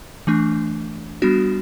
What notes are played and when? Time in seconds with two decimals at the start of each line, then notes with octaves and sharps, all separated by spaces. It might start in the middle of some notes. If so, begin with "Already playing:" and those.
0.27 E3 A3 D4
1.22 G3 B3 D4 F#4